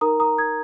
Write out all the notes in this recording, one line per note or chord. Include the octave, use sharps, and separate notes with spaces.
D#4 A#4 A#5 D#6
A#5 D#6
D#6 G#6